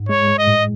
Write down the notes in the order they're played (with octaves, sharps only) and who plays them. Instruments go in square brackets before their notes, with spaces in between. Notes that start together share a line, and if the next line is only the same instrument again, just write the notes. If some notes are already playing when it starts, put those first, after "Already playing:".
Already playing: [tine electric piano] G#2
[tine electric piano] G#3 [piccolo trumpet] C#5
[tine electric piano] G#3
[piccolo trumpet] D#5
[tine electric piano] A2